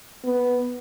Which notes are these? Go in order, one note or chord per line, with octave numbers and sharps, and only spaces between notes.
B3